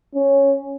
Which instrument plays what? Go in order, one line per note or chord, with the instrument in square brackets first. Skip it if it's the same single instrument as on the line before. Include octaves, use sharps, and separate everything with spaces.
[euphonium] C#4